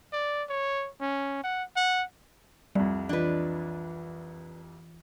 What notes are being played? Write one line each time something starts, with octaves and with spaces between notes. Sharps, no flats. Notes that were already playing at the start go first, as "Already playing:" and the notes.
D5
C#5
C#4
F#5
F#5
C2 F2 G3
E3 D4 F4 B4 D#5